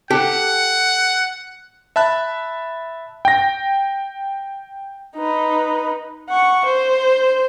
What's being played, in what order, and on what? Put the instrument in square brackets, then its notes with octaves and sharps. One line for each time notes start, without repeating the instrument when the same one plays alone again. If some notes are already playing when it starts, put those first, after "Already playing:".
[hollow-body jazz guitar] G4 A4 [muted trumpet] F#5
[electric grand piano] E5 A5 B5 F#6
G5 A#6
[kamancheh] D#4 B4
F#5 C#6
C5